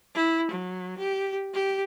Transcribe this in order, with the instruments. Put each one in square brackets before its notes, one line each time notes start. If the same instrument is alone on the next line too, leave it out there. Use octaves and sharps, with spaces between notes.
[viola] E4
F#3
G4
G4